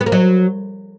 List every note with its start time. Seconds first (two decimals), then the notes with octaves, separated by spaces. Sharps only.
0.01 B3
0.06 A#3
0.12 F#3